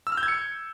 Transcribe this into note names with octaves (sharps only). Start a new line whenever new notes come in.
E6
F6
G6
G#6
C#7